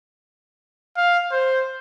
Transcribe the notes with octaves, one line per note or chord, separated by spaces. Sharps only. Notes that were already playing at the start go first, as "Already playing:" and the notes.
F5
C5